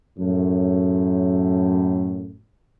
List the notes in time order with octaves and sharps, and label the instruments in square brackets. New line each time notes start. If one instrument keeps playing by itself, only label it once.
[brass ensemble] F#2 A2